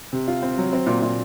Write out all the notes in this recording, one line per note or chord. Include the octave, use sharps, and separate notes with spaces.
C3
F4
C4
F#3
C4
A#2
A#2